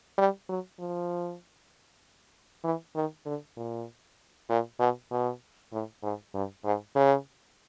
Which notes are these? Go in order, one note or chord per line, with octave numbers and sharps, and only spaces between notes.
G3
F#3
F3
E3
D#3
D3
A#2
A#2
B2
B2
A2
G#2
G2
G#2
C#3